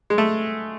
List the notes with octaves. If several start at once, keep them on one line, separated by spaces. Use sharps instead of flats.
G#3
A3